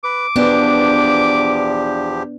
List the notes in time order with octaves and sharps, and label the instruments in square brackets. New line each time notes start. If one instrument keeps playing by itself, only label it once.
[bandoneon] B4 [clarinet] D6
[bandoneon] E2 F3 G4 [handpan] B3 [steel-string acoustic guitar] D4